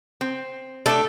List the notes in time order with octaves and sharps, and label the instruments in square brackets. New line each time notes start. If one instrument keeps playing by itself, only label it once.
[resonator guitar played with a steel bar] C4
[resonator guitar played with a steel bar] A3 D4 G4 [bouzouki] A4